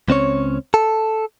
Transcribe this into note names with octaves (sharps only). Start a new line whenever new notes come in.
C#2 C4 C#4 C#5
A4